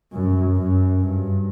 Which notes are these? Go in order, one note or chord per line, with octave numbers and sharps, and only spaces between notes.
F#2
F#2
G2